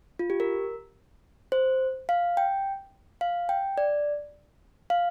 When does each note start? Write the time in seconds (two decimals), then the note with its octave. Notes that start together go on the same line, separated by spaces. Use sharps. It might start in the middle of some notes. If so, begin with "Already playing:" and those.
0.19 F4
0.30 G4
0.40 A#4
1.52 C5
2.09 F5
2.37 G5
3.21 F5
3.49 G5
3.78 D5
4.90 F5